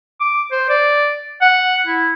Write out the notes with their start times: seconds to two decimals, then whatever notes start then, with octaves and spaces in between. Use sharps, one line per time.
0.21 D6
0.52 C5
0.69 D5
1.42 F#5
1.86 E4